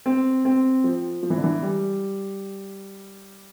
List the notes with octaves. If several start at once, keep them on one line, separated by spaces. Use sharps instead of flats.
C4
C4
F3
F3
E3
D3
E3
G3